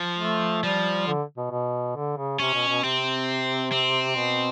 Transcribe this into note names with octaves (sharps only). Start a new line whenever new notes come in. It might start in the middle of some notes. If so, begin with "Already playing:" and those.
Already playing: F3
A3
F3 G3
D3
B2
B2
D3
C#3
C3 C#4
B2
B2
C3 C4
C4
B2